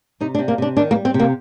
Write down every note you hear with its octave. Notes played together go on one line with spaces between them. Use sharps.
C3 D#4
D4
C3
A#3
C3 D4
D#3 D4
A#3
G3
C4
C3
A#3